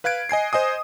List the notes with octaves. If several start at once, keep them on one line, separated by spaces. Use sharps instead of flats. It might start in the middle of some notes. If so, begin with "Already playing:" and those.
B4 F5 F#6 G#6 D7
D#5 G#5 G#6 C7
C5 D#5 G#5 D#6